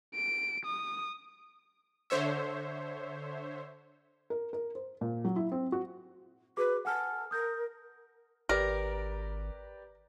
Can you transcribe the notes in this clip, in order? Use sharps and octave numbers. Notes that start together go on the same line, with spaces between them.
D7
D#6
D3 C5 C#5 E5
A#4
A#4
C5
A#2
F#3
E4
C4
F#4
F#4 G#4 B4 D6
A4 F#5 G#5 F6
A#4 D#6 G6
G#1 G4 A#4 B4 D5